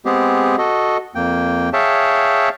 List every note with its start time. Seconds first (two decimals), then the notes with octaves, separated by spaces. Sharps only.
0.05 G#3 B3 C4 G4 G#4
0.58 F#4 A4 D#5
1.15 F2 A#3 G5
1.73 G#4 C#5 E5 F5 G5 A5